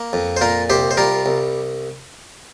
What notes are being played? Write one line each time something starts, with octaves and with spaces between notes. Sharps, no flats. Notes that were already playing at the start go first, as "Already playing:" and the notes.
Already playing: A#3
F2
C5
A#2 F4 A#4
C2 G4 C5
C5
G3 F4 A#4
C2